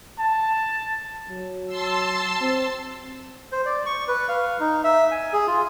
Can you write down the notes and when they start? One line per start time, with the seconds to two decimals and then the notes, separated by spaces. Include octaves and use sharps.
0.19 A5
1.29 F#3
1.67 A5 C6 E6
2.40 C4
3.52 C5
3.66 D5
3.86 C#6
4.08 B4
4.29 F5
4.60 D#4
4.84 E5
5.11 G#5
5.33 G#4
5.47 F4